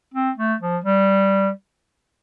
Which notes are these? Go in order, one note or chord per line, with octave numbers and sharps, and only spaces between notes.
C4
A3
F3
G3